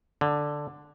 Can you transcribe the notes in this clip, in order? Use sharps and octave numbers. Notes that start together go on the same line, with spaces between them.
D3